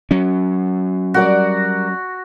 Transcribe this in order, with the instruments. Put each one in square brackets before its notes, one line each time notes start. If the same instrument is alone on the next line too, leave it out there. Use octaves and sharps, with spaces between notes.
[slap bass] F#3 C#4
[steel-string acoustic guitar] G3 A#4 D5 [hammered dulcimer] F#4